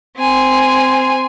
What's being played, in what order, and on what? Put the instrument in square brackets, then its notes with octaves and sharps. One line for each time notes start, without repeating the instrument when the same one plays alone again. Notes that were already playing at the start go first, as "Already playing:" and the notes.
[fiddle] C4 G#5